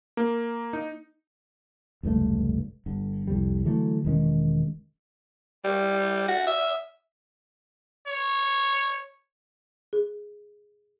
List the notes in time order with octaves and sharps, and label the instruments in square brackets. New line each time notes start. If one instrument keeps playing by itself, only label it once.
[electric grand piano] A#3
D#4
[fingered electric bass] F1 C#2 G2 A3
G1 D3
C2 F2 G3
D3 E3 F#3 A3
E1 D#3 G#3 C#4
[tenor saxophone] G3
F#4
E5
[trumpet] C#5
[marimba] G#4